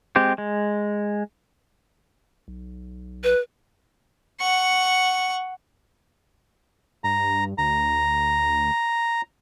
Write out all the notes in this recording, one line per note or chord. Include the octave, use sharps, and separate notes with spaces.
G#3 C4 G4
G#3
B1
B4
F#5 C#6
G2 A#5
D2 A#5